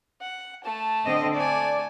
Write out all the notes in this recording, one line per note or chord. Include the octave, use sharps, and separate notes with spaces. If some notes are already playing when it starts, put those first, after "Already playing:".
F#5
A3 A5
D3 C4 D#5
A3 D5 G#5